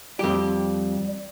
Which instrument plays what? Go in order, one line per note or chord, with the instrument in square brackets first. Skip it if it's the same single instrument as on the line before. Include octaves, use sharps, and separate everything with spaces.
[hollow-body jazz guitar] F2 G4 [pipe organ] G3